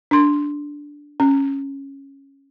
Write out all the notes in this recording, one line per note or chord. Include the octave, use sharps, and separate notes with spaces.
D4 C6
C#4